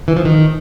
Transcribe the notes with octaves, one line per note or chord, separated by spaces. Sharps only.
E3
F3
D#3